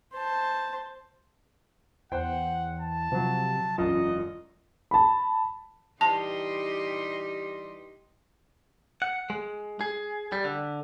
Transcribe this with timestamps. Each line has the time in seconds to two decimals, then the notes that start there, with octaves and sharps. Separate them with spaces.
0.13 C5 A5
2.12 E2 C5 F#5 G5
2.79 A5
3.12 C3 F3 F#3
3.78 E1 F#2 F4 D#5
4.91 A5 B5
6.01 E3 G3 D#4 G4 A5 C6
9.02 F#5
9.30 G#3
9.81 G#4
10.32 G3
10.44 D3